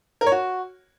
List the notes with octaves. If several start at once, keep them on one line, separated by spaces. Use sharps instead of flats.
A#4
C#5
F#4